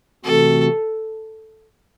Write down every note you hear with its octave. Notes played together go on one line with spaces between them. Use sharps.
C3 E3 A3 C4 F#4 A4